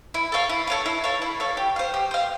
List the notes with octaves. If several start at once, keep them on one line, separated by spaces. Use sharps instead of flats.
E4
A4 C#5 F5
E4
A4 C#5 F5
E4
A4 C#5 F5
E4
A4 C#5 F5
G4
C5 F5
G4
C5 F5